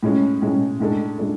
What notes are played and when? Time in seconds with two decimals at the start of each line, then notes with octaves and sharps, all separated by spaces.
0.03 A2 G#3 C#4
0.42 A2 G#3 C#4
0.80 A2 G#3 D4 A4
1.18 A2 G#3 D4 A4